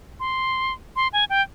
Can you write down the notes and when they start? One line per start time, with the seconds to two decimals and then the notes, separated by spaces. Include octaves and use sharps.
0.20 C6
0.96 C6
1.13 G#5
1.30 G5